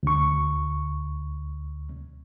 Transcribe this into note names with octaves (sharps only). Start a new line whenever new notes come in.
D2 C#6